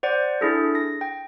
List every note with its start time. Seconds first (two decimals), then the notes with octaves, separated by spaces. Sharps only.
0.03 C5 D5 F#5
0.41 D4 E4 G#4 A4
0.75 A#6
1.01 G5